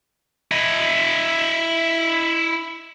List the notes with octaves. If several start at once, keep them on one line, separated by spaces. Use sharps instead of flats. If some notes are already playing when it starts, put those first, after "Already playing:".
E4 D#5